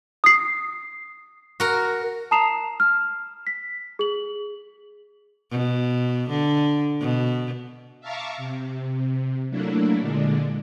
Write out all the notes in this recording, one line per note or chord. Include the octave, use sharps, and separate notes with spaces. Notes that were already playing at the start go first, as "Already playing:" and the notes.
D#6 C7
F#4 A#4
A5 A#5 D#6 C7 E7 F7
F6
B6
G#4 F#7
B2
D3
B2
E5 F5 A5 A#5 C#6 D6
C3
F#3 A3 A#3 D4 E4
A#2 D3 G#3 D4